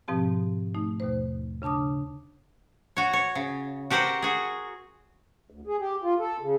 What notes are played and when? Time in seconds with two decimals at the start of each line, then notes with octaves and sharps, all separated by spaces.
0.08 G#2 B2 F3 C4 G4 A5
0.75 A3 D#4
1.00 D#2 B2 A3 C5
1.62 C#3 D4 A5 D6 D#6
2.97 F#4 C#5
3.13 C#5
3.35 C#3
3.90 F#4 G4 A#4 C5 F#5
4.22 F#4 G#4
5.50 D2
5.67 G#4
5.80 G4
6.03 F4
6.19 A4
6.41 C#3